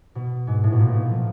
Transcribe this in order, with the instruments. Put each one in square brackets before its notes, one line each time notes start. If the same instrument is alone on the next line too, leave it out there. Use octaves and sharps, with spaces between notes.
[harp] B2
G#2
A2
B2
A#2
B2
F3